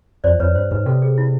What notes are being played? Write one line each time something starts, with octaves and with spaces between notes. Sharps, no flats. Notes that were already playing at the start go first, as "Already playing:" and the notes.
F2 C5 D5
F2 B4 C#5
G2 C5
G#2 B4
C3 A4
G#4
E4